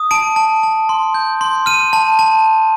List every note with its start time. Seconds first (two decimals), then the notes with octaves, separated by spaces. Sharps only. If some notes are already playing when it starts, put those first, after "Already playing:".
Already playing: D#6
0.11 A5 D7
0.36 A5
0.63 A5
0.89 C6
1.14 G6
1.41 C6
1.66 F6 D#7
1.93 A5
2.19 A5